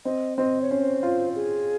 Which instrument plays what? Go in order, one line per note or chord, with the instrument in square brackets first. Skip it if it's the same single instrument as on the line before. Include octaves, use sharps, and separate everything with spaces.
[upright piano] C4 [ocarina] D#5
[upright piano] C4 [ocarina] D#5
[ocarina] C#5
[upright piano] C#4 [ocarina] C5
[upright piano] F4
[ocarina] G#4